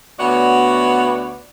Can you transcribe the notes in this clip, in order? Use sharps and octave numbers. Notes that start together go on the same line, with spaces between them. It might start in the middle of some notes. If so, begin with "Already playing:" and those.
D2 B3 F#4 C#5 D5 F#5